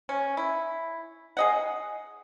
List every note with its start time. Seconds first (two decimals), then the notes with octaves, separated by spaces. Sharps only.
0.09 C#4
0.37 E4
1.37 G#4 D#5 F#5